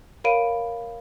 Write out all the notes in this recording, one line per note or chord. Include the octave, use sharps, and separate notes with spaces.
A#4 C#5 F5 B5 D7 D#7